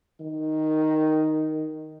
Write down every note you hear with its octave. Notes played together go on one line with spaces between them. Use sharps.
D#3